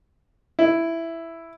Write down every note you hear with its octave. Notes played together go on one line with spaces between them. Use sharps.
E4